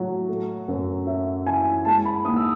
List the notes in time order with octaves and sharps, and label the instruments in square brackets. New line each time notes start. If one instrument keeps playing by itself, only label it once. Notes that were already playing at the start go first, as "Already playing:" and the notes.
Already playing: [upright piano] A2 F#3
A3
F#2
C#4 E5
E3 G#5
G#3 A5
B5
D#2 D#6
E6